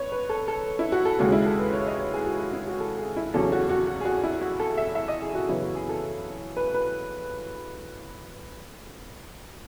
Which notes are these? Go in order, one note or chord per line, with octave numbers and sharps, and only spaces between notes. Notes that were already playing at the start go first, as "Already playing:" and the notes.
Already playing: B4 C#5
B4
A4
A4
E4
F#4
A4
D#2 C#3 G#3 F#4
E4
A4
B4
C#5
D#5
C#5
G#4
F#4
F#4
E4
F#4
A4
G#4
E4
E2 C#3 F#3 C#4 A4
F#4
F#4
F#4
G#4
F#4
E4
F#4
A4
E5
E5
D#5
G#4
F#4
F#2 C#3 E3 B3 E4
F#4
G#4
A4
B4
B4